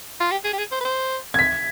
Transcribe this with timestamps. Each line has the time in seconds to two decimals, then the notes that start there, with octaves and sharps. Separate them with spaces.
0.20 F4
0.31 G4
0.44 G#4
0.53 G4
0.58 G#4
0.72 C5
0.81 B4
0.85 C5
1.34 G#6
1.39 B6